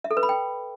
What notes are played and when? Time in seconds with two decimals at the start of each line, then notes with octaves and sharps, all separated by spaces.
0.04 E5
0.11 A4
0.17 B4
0.23 B5
0.29 G5